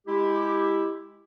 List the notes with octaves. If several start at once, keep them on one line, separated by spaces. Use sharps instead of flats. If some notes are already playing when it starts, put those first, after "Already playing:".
G#3 E4 G4